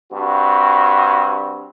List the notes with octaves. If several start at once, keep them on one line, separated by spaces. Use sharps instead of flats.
G2 C4 F#4